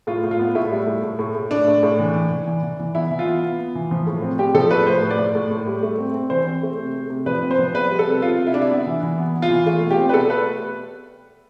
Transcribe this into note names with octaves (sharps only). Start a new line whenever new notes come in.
A2 F4
A2
F4
B3
A2 E4
G3
A2
A2
A2
A2
A2 D4
A2
A2
E3
E3
E3
E3
E3
E3
B3 E4
E3
F4
B3
B3
B3
E3
F3
A2
C4
C4 G4
F3 A4
A2 B4
A2 C5
A2
D5
A2
A2
A2
G3
A3
C4
C4
E3 C5
C4
A3
C3
A3
C3
F3 B4
C4
C5
F3
B3 B4
G3
A4
C3
C3 F4
C3
E4
C3 D4
E4
B3
E3
E3
B3
B3
F4
E3
A3 F4
B2
G4
C4
B4
B2 A4
A3 B4